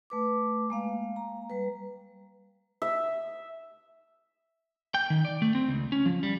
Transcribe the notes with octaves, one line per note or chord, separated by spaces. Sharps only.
A3 B4 D6
G#3 A#3 F5
A#5
G3 B4
E5
G5
D#3
D5
A3
C4
C#2
C#4
F3
G3